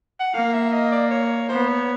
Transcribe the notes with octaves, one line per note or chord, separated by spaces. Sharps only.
F#5
A#3 F5
E5
D#5
D5
C#5
B3 C5
C#5